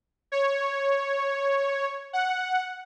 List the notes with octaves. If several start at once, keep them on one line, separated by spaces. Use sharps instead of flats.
C#5
F#5